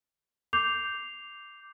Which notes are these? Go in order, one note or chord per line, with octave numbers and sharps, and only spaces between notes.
D6 G6 C7 F7